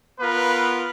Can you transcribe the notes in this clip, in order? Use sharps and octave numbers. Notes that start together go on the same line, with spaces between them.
B3 F4 A#4 B4